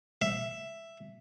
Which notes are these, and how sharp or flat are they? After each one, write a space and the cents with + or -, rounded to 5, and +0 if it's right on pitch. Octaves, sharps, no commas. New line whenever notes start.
E5 +5